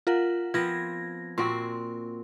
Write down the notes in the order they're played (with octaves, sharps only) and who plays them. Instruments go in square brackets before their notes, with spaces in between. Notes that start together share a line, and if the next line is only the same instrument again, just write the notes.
[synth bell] F4 A#4 F#5
[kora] F3 B3 C4 [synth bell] G#6 A#6
[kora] A#2 C4 F#4 [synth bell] C6 C#6